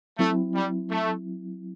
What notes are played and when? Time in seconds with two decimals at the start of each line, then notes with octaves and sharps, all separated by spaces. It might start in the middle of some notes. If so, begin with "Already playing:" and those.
0.18 F#3 A3 C4 E4
0.55 G3
0.90 A3